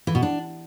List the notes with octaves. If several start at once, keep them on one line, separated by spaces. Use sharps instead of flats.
E3
B2
D4